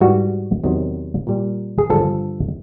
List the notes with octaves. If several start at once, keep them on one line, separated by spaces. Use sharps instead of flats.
G#2 E3 G3 F#4
E2 C3 D#3 F#3
A#2 G3
G#4
G2 D3 F3 A4